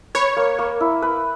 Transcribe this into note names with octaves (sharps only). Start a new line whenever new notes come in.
B4 C#5
A#3
A#3
E4
B4